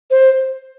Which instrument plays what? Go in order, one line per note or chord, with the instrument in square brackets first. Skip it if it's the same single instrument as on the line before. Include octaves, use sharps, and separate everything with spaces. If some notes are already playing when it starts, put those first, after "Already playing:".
[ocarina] C5